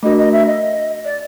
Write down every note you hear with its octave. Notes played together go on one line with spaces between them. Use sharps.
A3 D4 F#4 A#4 D#5
D#5
E5
D#5
D5